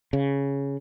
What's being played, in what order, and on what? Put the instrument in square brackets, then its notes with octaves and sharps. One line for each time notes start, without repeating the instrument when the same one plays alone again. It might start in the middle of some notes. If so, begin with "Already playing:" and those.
[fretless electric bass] C#3